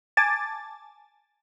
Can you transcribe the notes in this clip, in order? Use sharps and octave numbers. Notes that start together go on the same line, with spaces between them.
G#5 A5 D6 A6